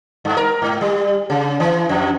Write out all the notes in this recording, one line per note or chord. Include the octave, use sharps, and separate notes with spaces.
G2
A#4
G#2
G3
C#3
E3
F2